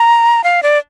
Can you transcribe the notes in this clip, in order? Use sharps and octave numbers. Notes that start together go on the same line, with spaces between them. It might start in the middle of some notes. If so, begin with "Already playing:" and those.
Already playing: A#5
F5
D5